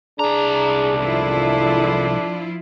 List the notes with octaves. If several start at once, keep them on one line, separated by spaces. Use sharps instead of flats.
C2 D4 G#4 A#5
G#1 E2 F3 E4 F4 A4